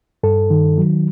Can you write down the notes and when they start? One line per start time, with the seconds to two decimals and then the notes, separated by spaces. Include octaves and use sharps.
0.23 G2 A4
0.50 D#3
0.78 F#3